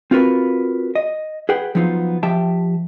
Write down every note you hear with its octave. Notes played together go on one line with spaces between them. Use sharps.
C4 F4 F#4 A#4 B4
D#5
G#4 B4 F#5 G5
F3 F#3 B3 D#4 F4
F3 G4 E5 G5 A5